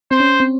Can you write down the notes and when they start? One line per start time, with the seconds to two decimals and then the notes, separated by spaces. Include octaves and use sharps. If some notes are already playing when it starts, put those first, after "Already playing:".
0.11 C4 C5
0.20 C#4
0.40 C4